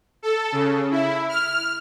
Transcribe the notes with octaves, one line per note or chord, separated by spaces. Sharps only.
A4
C#3
E4
F6